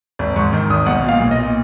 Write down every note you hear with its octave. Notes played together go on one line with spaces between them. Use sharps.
G#1
G#2 C#6
D#3
G#1 D#6
B1 F#5
A#2 F5
B1
D#5
A#2